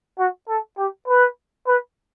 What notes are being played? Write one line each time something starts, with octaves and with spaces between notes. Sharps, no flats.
F#4
A4
G4
B4
B4